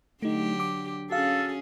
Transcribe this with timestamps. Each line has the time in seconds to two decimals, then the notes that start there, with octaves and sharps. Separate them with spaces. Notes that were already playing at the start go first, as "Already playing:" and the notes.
0.22 D3 F#3 A3 D#4 G4
0.60 D6
1.11 C#4 F#4 G#4 A4 F5